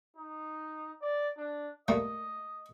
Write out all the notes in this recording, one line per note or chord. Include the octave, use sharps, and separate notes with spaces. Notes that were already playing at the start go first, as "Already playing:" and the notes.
D#4
D5
D4
G3 A3 A#3 D#5